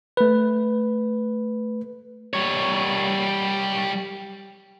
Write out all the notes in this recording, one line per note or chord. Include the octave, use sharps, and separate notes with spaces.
A3 B4
G3 C#5